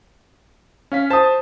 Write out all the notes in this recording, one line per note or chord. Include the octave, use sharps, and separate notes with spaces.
C#4 F5 B6
C5 A5 D#6